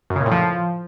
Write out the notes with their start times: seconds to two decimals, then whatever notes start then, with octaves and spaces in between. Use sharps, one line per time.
0.10 F#2
0.16 C#3
0.21 A#2
0.26 A2
0.31 F3